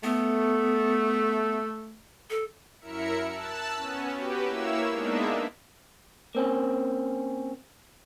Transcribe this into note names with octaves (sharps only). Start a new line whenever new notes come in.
A3 B3
A4
F#2 E4 A#4 E5 C#7
A5 E6 F#6
B3 C#4
F#4 G4 B4
A#3 E4 C#5 E6
G#3 A#3 B3 D4 D#4 E5
A#3 C4 C#4